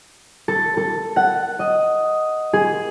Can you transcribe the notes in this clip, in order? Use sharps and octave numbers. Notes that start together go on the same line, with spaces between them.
A4
A4
F#5
D#5
G#4